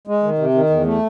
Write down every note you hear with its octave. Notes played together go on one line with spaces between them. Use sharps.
G#3
D#3
C3
D#3
E2
A3